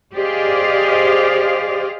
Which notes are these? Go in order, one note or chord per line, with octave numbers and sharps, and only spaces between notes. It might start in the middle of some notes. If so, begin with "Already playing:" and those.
G4 G#4 C5 D5 D#5 F5